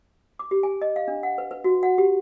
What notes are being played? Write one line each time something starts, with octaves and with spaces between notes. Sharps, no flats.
D6
G4
G#5
D#5
F5
D4
F#5
B4
B4
F#4
F#5
G4